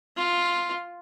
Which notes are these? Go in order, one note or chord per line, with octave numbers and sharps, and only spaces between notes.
F4